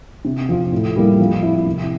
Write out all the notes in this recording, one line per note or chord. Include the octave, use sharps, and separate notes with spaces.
C3
F3 C4 F4
A2
G3 A#3 E4
F3
C4 E4
C3